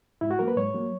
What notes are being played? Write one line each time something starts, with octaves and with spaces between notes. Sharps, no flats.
G#2 E4
F#4
F#3 A#3 A#4
B4
G#2 C#5
F#3 A#3